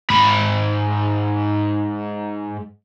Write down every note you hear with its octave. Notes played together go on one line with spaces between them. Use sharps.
G#2 B5